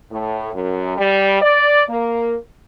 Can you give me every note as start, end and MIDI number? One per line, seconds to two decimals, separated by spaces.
0.11 0.51 45
0.53 0.95 42
0.98 1.36 55
1.42 1.82 74
1.89 2.35 58